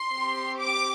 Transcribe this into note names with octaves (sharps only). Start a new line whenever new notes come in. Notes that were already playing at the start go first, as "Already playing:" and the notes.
Already playing: C6
C4 G4
D6